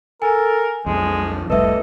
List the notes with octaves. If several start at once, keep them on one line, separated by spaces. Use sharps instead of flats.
A4 A#4 G#5
B1 F2 F3 G#3
F1 C2 A2 A4 B4 D#5 E5